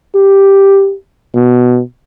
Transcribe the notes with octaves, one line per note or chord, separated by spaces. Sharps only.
G4
B2